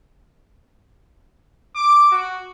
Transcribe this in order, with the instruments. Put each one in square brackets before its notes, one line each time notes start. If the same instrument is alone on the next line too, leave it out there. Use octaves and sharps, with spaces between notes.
[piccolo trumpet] D6
F#4